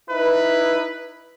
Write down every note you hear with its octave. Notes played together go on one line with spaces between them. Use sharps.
D#4 E4 B4